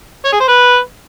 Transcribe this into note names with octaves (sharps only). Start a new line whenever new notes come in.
C#5
G#4
C5
B4